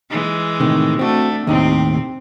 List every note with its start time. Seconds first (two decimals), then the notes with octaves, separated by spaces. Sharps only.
0.11 E3 G#3
0.59 A2 C3 D#3
0.99 A3 C4 D4 F#4
1.47 D#2 A2 C3 C4 D#4